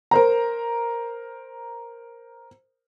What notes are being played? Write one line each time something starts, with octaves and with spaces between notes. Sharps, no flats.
A#4 C5 A#5